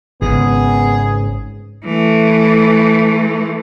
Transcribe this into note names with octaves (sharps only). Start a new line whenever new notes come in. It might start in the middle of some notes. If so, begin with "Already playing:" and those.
G#1 G#2 C#3 B3 G#4
E3 A3